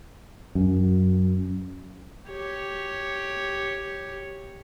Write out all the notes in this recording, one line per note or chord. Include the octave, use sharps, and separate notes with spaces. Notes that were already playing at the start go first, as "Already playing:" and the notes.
F#2
G4 C#5